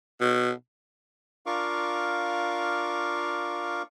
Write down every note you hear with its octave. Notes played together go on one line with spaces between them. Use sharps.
B2
D4 F4 A#4 F5 C#6 D6